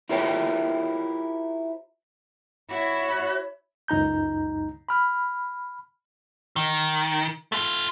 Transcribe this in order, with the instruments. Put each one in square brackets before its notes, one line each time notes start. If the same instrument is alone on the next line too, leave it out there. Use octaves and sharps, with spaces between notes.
[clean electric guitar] E4 F4 G4 A#4 C5 C#5
[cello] E4 [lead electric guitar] F#4 [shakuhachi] C#5
[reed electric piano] C#2 F#2 D#4 A#5 G6
B5 F6
[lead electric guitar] D#3
A3 F4